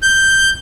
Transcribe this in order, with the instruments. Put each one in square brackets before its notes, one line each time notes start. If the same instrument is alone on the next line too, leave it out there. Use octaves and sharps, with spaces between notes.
[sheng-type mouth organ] G6